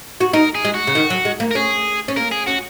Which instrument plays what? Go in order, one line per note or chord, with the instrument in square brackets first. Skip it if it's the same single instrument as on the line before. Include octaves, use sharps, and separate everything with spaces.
[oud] F#4
[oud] D#4 [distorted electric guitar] A#4
[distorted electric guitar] G#4
[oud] G#3
[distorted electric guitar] F#4
[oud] C#3
D#3
F#3
G#3
A#3
[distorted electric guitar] A#4
[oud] C#4 [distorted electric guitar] G#4
[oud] C#4
[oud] A#3 [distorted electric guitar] A#4
[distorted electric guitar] G#4
[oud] C#4 [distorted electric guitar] F#4